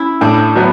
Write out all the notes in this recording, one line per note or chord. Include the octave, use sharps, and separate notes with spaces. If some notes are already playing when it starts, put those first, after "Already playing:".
Already playing: C#4 E4
A2 D4
F#3 B3